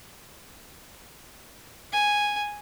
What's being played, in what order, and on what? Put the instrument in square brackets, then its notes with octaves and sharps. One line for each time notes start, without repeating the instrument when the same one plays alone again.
[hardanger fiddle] G#5